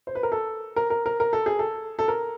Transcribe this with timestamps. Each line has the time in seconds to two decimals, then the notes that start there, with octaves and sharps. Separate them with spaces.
0.07 C5
0.15 B4
0.23 A#4
0.32 A4
0.76 A#4
0.90 A#4
1.06 A#4
1.20 A#4
1.33 A4
1.46 G#4
1.59 A4
1.99 A4
2.08 A#4